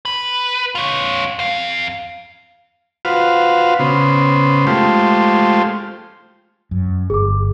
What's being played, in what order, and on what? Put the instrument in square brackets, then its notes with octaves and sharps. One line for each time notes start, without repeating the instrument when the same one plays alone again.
[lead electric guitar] B4
F4 C#5
F2 F5
[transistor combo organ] F4 F#4 B4 C5 F5
C#3 B3 C5
G#3 A3 F4 G4 C5
[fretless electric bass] F#2
[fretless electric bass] G1 [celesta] G#4 D6